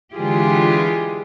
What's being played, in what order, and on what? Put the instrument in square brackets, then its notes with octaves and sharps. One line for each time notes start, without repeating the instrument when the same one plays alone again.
[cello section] D3 E3 G#3 F4 G4 G#4